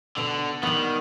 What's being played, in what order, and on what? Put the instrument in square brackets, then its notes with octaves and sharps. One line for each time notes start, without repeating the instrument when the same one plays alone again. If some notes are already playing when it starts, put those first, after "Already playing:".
[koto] B2 [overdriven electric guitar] D3
[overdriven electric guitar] D#3 [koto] G3 B3